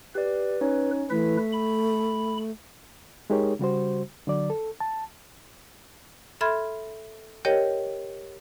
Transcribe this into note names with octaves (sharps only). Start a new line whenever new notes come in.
G4 B4 D5
C#4 D#4 C#5
E3 A3 E4 B4 B6
B5
G#3 D#4 G4 G#4 A#4 C#5
C#3 G3 F#4 C5
D3 F#3 D5
A4
A5
A4 E5 B5 C6 F6 G#6
G4 A#4 C#5 D#5 G5